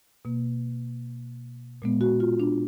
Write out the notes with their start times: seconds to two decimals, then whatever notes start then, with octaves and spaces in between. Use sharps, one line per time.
0.25 B2 A#3
1.82 A#2 G#3 B3
2.01 F#4
2.20 F4
2.40 D4